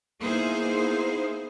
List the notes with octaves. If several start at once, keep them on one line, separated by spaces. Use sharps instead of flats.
A#3 B3 D#4 E4 G#4 C5